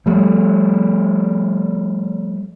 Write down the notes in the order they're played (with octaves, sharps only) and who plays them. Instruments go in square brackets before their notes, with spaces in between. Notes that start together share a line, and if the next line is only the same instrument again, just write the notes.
[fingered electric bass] F3 G3 A3